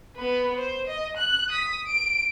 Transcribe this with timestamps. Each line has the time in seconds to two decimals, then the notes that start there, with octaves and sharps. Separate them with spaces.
0.17 B3 B4
0.57 C5
0.88 D#5
1.18 F#6
1.49 D#6 B6
1.87 D7